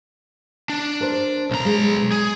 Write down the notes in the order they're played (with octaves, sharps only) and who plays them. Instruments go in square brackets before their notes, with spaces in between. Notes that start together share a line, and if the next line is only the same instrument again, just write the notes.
[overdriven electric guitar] D4
[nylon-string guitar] A#4 C5
[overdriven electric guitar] B1 A#5 [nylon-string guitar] C#4
[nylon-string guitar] G#3
[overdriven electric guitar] G#4